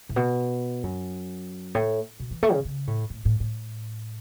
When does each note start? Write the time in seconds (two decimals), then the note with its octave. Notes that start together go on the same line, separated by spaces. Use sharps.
0.09 A2
0.16 B2
0.83 F#2
1.75 A2
2.20 B2
2.31 E3
2.43 A3
2.53 C#3
2.65 C#3
2.87 A2
3.10 A2
3.25 A2
3.40 A2